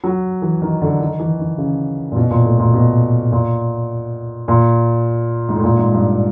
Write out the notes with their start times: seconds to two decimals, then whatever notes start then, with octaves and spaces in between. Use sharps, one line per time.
0.04 F#3
0.42 E3
0.62 D#3
0.82 D3
1.00 D#3
1.20 E3
1.39 D#3
1.58 C#3
2.12 A#2
2.16 B2
2.30 A#2
2.45 A2
2.59 A#2
2.74 B2
3.32 A#2
4.48 A#2
5.49 G#2
5.56 A2
5.64 A#2
5.78 G#2
5.93 G2